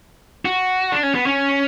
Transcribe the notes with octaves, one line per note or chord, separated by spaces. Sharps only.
F#4
D4
C#4
B3
C#4